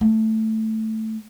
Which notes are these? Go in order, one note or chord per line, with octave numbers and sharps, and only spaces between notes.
A3